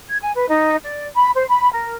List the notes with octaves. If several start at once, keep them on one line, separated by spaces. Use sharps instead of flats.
G#6
G#5
B4
D#4
D5
B5
C5
B5
A#4